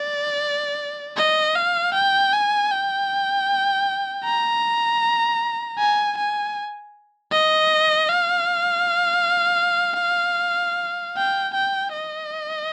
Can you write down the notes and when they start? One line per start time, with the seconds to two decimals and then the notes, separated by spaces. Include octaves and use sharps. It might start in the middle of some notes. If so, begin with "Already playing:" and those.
Already playing: D5
1.17 D#5
1.55 F5
1.94 G5
2.33 G#5
2.71 G5
4.25 A#5
5.78 G#5
6.17 G#5
7.32 D#5
8.09 F5
11.17 G5
11.55 G5
11.94 D#5